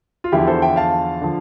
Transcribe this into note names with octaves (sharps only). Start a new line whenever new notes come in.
F4
E2 D3 F3 E4 G4
A4 C5
E5 G5
F5 A5
D3 F3